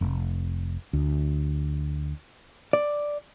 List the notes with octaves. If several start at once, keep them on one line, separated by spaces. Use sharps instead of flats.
F1
D2
D5